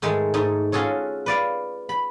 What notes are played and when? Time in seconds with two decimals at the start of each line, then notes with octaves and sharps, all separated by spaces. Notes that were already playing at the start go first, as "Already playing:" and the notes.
0.02 G#2 D#3 G#3 A3
0.34 G#2 A3 D#4
0.72 C#4 F4 F#4 G#4 A4 C#5
1.26 B4 D5 F5
1.89 B5